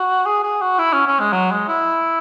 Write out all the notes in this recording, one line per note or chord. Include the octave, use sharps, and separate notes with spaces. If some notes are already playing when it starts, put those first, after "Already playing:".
Already playing: F#4
G#4
G#4
F#4
E4
C#4
C#4
G#3
F#3
G#3
E4